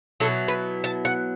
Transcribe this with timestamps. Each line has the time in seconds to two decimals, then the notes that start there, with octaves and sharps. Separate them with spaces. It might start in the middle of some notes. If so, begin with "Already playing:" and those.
0.20 B2 F#3 B3 E4 A4
0.48 B4
0.84 A5
1.05 F#5